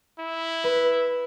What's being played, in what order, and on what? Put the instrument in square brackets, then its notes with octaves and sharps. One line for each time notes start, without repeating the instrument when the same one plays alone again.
[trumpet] E4
[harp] B4